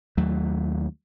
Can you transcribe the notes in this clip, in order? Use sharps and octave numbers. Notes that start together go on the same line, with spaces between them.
D#2 F#3 A3